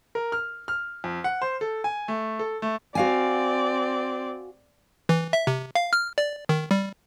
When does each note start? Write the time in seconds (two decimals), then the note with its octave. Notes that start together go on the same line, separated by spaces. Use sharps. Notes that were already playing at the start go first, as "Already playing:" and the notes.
0.15 A#4
0.32 F6
0.68 F6
1.04 F2
1.24 F#5
1.42 C5
1.61 A4
1.84 G#5
2.08 A3
2.39 A4
2.62 A3
2.95 C4 F#4 D5 F5 G#5
5.09 E3
5.33 E5
5.47 C3
5.75 F5
5.93 F6
6.18 D5
6.49 D#3
6.71 G3